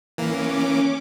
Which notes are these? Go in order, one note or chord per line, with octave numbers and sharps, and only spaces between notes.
E3 A#3 C#4 D6